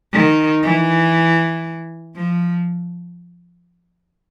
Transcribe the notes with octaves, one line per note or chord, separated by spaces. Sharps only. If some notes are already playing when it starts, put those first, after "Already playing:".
D#3
E3
F3